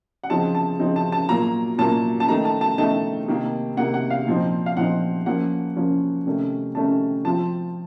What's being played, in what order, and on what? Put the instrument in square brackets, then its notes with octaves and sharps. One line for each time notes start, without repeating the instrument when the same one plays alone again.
[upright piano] F#5
C#3 F3 C4 D#4 A5
A5
C#3 F3 C4 D#4
A5
A5
A#2 F#3 A#3 F4 A#5
A#2 F#3 A#3 F4 A5
A5
D#3 A3 D#4 A#5
A5
A5
D#3 A3 D#4 A5
C3 D#3 A#3
C3 D#3 A#3 F#5
F#5
F5
A#2 F3 C4 D#4
F5
A#2 F3 C4 D#4 F#5
F3 A#3 C#4 F#5
F3 A#3 C#4
C3 D#3 A3 C#4
C3 D#3 A3 C#4 A5
F3 C4 F4 A5